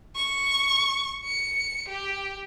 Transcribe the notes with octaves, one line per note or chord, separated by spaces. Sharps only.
C#6
C#7
G4